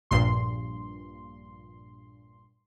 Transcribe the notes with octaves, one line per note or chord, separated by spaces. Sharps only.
A#1 G2 A#2 C6